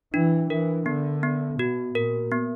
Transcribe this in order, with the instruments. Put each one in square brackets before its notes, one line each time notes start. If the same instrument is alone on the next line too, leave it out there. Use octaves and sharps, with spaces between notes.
[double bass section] E3 [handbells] D4
[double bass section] E3 [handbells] A#4
[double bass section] D3 [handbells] B3
[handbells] B3
[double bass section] B2 [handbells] F#4
[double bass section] A#2 [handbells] A#4
[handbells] B3